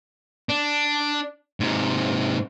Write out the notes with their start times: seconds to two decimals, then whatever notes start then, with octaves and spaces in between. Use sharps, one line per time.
0.49 D4
1.60 G#2 C3